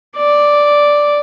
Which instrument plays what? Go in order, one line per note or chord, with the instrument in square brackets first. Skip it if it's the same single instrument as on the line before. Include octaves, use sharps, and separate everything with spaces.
[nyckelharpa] D5